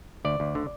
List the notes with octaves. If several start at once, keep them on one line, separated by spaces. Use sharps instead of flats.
D2 D5
D2
D3